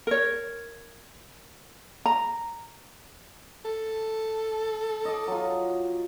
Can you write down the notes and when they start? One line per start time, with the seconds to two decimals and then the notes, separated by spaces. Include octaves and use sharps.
0.07 A#4 C#5
2.06 A#5
3.65 A4
5.05 D#5 D6
5.27 F#3 F4